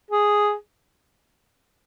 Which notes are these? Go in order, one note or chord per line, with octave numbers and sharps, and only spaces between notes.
G#4